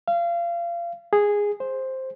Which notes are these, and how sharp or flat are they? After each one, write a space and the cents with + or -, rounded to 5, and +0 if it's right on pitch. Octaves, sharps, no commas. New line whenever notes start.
F5 -30
G#4 -10
C5 +5